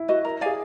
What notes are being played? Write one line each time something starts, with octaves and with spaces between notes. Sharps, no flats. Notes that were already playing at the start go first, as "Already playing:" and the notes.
Already playing: E4
F#4 B4 D#5
A#4
G#4 D5 F5 G#5